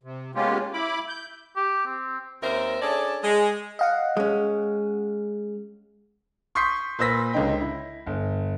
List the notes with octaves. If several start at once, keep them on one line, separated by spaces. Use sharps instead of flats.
C3
G#3 A#3 B3 C#4 F4 G4
E4 B5 D6
G6
G4
C4
D#2 C4 C#4 A#4 C5 E5
C#4 D4 G#4 A4 C#5 D5
G#3
D#5 F5 F#5
G#3 C#4
C6 C#6 D#6 G6 B6 C7
A#2 B4 C5 E6 A#6 B6
C#2 D3 C#4 D#4 G5
E4
G1